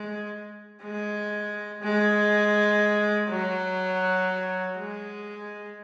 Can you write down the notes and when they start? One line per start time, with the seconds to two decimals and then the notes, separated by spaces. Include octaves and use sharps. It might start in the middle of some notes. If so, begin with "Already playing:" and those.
Already playing: G#3
0.82 G#3
1.82 G#3
3.29 F#3
4.78 G#3